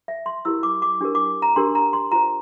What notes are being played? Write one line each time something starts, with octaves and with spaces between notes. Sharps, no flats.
E5
C6
E4 G4 A#4 E6
D6
D6
D4 G4 A#4
D6
A#5
D4 G4 A#4 C6
A#5
C6
F4 C5 A#5